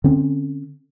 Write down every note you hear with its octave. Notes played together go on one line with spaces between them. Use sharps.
D3 C4 C#4